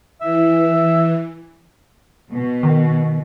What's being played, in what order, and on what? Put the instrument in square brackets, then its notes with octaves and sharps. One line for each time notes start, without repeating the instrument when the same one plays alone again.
[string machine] E3 [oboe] E5
[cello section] B2
[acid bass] D#3